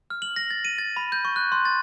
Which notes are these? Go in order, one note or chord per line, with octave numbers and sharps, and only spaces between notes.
F6
F#7
A#6
A6
D#7
A6
B5
G6
C#6
F#6
C6
A6